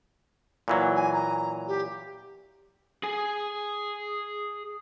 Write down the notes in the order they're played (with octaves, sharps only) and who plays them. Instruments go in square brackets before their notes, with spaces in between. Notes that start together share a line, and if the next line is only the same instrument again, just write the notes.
[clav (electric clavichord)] A#2 E3 F#3
[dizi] G#5
A#5
G4
[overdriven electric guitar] G#4 G#5